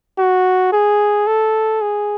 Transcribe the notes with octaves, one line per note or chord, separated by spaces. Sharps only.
F#4
G#4
A4
G#4